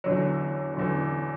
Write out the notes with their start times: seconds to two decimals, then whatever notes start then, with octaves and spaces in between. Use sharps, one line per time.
0.04 E2 D3 F#3
0.75 E2 D3 F#3